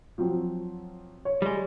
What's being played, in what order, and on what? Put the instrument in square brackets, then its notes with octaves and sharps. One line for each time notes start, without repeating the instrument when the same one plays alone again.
[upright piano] F3 F#3 C4
C#5
[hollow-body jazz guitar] G3 G#3